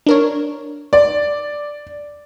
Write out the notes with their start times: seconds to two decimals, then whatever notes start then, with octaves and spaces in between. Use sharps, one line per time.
0.07 D4 A#4 C#5
0.93 D5